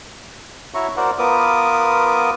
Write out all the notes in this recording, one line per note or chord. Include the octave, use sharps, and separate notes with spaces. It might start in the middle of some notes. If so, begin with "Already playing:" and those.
E4 F#4 C#5 E5 A#5 C#6
F#4 A#4 C5 D5 F#5
B3 F4 A#4 B4 D6 D#6